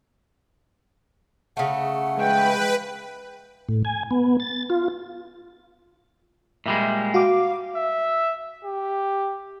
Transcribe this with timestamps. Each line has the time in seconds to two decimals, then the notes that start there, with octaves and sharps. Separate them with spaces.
1.57 C#3 A3 F#5
2.16 G#3 B4 G5
3.69 A2
3.85 G#5
4.11 B3
4.40 A6
4.70 F4
6.66 A#2 G3 G#3 E5
7.14 F#4 F5 D6
7.76 E5
8.64 G4